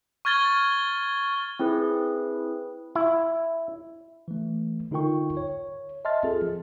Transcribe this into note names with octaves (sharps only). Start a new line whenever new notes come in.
C#6 F6 G#6 A6 G7
C4 E4 G#4 B4
E4
E3 A3
D3 D#4 F4 A#4 G5 C#6
C#5
D#5 E5 A5 C6 F6 A6
C4 F4 G#4 A4
F3